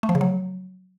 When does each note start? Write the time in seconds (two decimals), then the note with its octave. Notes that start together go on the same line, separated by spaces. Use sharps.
0.03 A3
0.09 F3
0.15 C#3
0.21 F#3